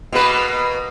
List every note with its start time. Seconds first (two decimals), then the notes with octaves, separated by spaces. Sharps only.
0.12 B2 A#3 B4